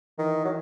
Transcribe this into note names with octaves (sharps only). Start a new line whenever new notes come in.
D#3 E3
F#3